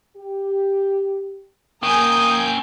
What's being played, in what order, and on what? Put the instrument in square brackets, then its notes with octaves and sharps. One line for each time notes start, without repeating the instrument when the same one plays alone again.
[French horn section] G4
[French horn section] A#3 [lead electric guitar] C#4 G5 [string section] G#5 A#5 G6 [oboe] D#6